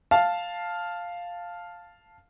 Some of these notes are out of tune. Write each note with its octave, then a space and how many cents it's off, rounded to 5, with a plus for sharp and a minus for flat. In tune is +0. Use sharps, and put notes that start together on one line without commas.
F5 +0 A5 +0